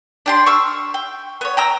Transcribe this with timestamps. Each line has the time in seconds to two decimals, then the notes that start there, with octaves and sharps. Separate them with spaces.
0.26 D4 G4 C6
0.46 C#6 E6 F6
0.94 G5
1.41 B3 C#5
1.57 G5 A#5 E6